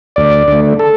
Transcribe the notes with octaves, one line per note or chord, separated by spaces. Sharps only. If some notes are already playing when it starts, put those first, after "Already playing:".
D2 D5
D3 A3
A4